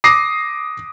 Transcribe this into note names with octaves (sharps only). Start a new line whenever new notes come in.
D6 D#6 A#6 C7